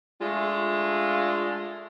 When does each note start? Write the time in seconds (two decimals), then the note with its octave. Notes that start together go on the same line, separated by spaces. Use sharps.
0.21 G#3 A3 D4 F4